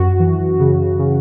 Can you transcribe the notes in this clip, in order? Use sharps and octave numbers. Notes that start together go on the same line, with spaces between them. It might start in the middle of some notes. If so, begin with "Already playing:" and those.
Already playing: F#2 F#4
E3
C#3
C#3